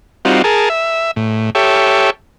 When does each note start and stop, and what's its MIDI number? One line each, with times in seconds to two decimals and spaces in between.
0.25 0.42 55
0.25 0.42 60
0.25 0.42 63
0.25 0.42 65
0.25 0.42 66
0.44 0.69 68
0.44 0.69 70
0.44 0.69 81
0.70 1.11 76
1.16 1.50 45
1.55 2.10 67
1.55 2.10 69
1.55 2.10 73
1.55 2.10 76